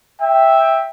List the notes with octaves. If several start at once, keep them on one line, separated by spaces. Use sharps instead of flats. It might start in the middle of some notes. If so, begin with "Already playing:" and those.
E5 G5